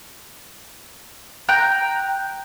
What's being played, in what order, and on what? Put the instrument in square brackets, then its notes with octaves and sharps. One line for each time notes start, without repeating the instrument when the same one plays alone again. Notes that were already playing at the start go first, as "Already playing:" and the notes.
[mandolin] G5 A#5 F#6 G6